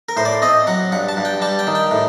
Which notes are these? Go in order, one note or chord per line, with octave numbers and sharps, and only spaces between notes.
A#4
A2 C5
D5
C4 D#5
F#3 F#5
G2 F#5
A5
G2
G5
G3 A5
G5
D#3
G5
A2